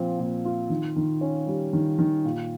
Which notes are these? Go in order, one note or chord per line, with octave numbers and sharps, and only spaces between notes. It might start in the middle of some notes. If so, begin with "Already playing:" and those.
Already playing: A#2 F3 C4
A#2
F4
D#3
D#3
C#4
G3
D#3
D#3
A#2